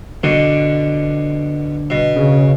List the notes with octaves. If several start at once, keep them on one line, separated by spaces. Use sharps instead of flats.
B2 D3
B2
C#3